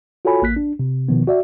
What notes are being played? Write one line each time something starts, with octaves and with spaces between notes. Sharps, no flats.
F4 F#4 A4 C#5 G#5 B5
A1 A#3 F#6 B6
D4
C3
B2 D#3 F3 B3
F#4 D5 E5